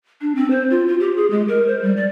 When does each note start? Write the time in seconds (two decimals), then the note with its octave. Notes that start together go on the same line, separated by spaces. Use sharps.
0.21 D4
0.35 C4
0.51 C5
0.70 F4
0.88 F4
1.00 G4
1.16 G#4
1.31 G#3
1.48 A#4
1.67 C5
1.82 G3
1.96 D5